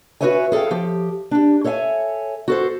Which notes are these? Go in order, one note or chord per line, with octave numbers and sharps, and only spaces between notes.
F#4 G#4 B4 C#5 E5 G#5
G#4 A4 D5 F5 G5
F3 G4
D4 G4
A4 C#5 E5 F5 G#5
F#4 A4 C5